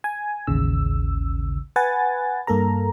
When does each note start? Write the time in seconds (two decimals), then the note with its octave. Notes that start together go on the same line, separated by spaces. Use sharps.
0.04 G#5
0.47 A1 D#2 C#3 E6
1.76 B4 F#5 G#5 A6
2.47 G2 A#3 A4 A#4 A#5